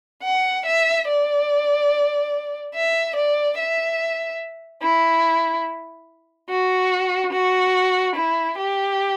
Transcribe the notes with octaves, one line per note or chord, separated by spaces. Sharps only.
F#5
E5
D5
E5
D5
E5
E4
F#4
F#4
E4
G4